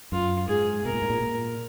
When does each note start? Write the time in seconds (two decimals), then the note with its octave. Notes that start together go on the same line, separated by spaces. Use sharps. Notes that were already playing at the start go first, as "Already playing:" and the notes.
0.12 F#2 F4
0.48 G#2 G#4
0.85 B2 A#4
0.94 A#2
1.02 G#2
1.10 A#2
1.22 A#2